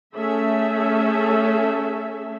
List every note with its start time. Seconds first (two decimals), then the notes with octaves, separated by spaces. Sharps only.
0.16 A3 C#4 G#4 A4 E5